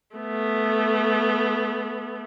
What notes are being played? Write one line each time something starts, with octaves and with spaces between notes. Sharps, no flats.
A3 B3